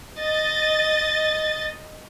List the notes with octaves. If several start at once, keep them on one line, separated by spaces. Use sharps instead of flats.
D#5 A6